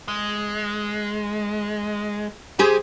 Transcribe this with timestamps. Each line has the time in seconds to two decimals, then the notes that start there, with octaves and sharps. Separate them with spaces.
0.08 G#3
2.59 C2 G4 G#4 C5 G#5